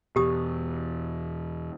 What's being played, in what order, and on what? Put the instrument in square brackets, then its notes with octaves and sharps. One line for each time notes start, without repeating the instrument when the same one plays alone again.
[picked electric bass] E2 B2 [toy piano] G4 D#6